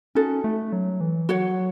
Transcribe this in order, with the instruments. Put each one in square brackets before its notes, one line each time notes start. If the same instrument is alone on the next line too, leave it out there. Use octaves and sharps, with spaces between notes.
[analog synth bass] C#4 [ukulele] D#4 F#4 A4
[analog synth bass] A3
F#3
E3
[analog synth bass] F#3 [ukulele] F#4 C#5 F#5